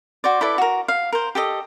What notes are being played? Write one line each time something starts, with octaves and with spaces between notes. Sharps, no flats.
F#4 C5 D5
E4 A4 B4 D5
F#4 A#4
F5
A#4 C5
G4 A4 D#5